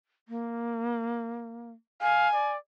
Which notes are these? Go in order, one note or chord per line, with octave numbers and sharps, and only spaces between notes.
A#3
F5 G#5
D5